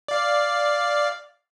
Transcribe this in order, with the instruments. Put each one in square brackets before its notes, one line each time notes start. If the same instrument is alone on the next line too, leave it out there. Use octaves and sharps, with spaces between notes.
[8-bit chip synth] D5 F5